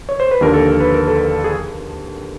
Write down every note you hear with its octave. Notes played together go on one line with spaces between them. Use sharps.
C#5
C5
B4
D#2 D3 F3 A#4
A4
A#4
B4
A#4
A4
A#4
G#4